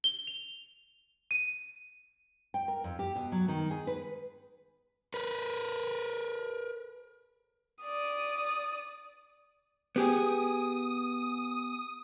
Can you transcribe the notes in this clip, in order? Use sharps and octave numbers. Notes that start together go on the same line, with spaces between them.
G7
F7
D#7
G5
A#4
F2
G4
B2
F#3
D#3
G#4
B4
A#4 B4
D5 D#6
B3 G4 G#4 D#6